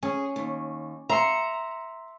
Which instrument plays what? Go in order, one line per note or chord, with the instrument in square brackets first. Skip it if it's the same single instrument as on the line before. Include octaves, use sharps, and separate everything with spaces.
[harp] C#4 [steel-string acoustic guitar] G#4
[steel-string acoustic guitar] D#2
[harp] E5 C6 C#7 [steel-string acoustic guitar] A#5